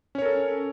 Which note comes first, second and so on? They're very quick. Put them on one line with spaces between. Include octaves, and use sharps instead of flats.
C#4 C#5 A#4 A4